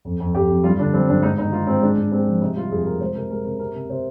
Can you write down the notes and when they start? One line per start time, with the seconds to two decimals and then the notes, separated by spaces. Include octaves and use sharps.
0.05 F2
0.20 F2
0.34 F2 G4
0.49 F2
0.64 G2 F4
0.78 D3 D4
0.93 G2 C4
1.08 G2 D4
1.23 G#2 D#4
1.38 D#3 D#4
1.52 G#2 F4
1.67 G#2 C4
1.82 G#3 D4
1.97 G#2
2.12 G#3 C4
2.26 F3
2.41 C3 D#4
2.56 G3 F4
2.71 F2 G#4
2.86 C3 A#4
3.01 G#3 C5
3.15 C3 A#4
3.30 G#3 A#4
3.45 C3 A#4
3.59 C3 A#4
3.74 C3
3.89 C3 C5